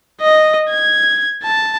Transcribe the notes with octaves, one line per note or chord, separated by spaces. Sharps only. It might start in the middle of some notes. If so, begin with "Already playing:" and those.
D#5
G#6
A5